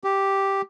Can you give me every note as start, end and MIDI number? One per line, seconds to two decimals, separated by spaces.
0.04 0.62 67